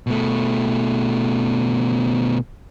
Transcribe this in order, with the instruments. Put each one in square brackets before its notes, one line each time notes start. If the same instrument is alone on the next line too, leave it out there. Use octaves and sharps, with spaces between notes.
[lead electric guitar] B2 A3